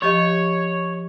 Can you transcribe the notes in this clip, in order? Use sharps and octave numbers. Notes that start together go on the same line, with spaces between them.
F3 G4 C#5 D#5